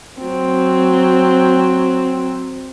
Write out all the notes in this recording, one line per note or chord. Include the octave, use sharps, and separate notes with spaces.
F#3 C4